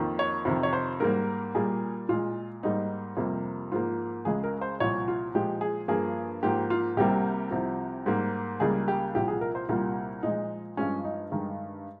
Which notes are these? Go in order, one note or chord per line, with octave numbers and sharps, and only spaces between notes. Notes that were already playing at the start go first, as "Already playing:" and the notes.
Already playing: F2 D#3 A#3
C#5
F2 C3 D#3
C#5
C5
G#2 G3 A#3 A#4
A#2 G3 A#3 G#4
A#2 G#3 F4
G#2 G3 A#3 D#4
F2 C3 G3 A#3
G#2 F3 A#3 F4
C#2 C#3 G#3 G#4
A#4
C5
C2 A#2 F3 C#5
F4
A#2 F3 G#3 G4
G#4
G2 F3 A#3 G#4
G#2 F3 A#3 G4
F4
C2 C3 G3 A#3 G4
C2 C3 F3
G#2 G3 A#3
C#2 C#3 G3 A#3 G#4
G4
C2 A#2 F3 G4
G#4
A#4
C5
C2 A#2 G3 A#3 F4
A#2 F3 G#3 D#4
G2 F3 G#3 C#4
D#4
G2 D#3 G#3